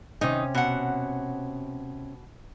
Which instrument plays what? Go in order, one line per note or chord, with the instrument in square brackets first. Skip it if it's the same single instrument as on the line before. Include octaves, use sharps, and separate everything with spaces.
[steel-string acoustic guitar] C3 C#4 [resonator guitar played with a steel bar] D#3 D#4
[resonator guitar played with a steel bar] B2 F#5